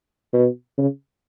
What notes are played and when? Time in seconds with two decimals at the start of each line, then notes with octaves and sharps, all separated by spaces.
0.33 B2
0.78 C#3